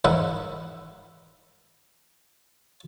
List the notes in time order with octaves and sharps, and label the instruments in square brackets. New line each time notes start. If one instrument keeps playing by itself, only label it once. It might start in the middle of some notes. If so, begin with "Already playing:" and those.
[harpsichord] G#2 E3 A#4 E5 F#5 B5